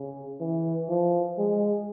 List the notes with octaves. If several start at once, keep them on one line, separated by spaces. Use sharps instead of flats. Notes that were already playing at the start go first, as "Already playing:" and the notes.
Already playing: C#3
E3
F3
G#3